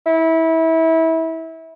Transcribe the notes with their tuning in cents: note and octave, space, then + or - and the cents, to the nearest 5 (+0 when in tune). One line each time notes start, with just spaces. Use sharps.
E4 -25